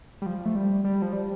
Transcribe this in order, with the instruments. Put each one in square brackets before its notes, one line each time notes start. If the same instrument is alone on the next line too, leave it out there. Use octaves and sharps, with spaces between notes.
[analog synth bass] G3
F3
A3
G3
G3
F3
G3